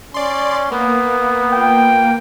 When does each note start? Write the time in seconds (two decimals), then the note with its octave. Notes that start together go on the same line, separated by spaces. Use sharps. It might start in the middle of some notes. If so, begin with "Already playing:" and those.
0.14 C#4 D5 C6
0.72 A#3 B3
1.53 F4 G5